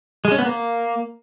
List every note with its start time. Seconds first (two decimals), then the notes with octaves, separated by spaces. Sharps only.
0.25 G#3
0.32 C#4
0.39 B3
0.46 A#3